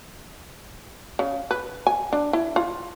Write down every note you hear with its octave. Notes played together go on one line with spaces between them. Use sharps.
C#3
B4
G#5
D4
E4
F4